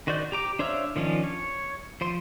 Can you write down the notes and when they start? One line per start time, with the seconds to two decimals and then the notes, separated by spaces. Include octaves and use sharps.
0.07 D#3 F#4 C5 D5 G6
0.32 G4 A#5 D6
0.59 D4 C5 C#5 E5 F5
0.96 D#3 F3 C#4 D4
1.24 C#5
2.01 F3 C5 C6